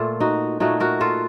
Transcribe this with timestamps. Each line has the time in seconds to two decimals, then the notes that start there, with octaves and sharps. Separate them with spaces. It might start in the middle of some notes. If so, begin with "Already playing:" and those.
Already playing: A#2 A3 F4 A4
0.20 D#4 F#4
0.60 A#2 A3 D#4 F#4
0.80 F#4 A#4
1.00 F4 A4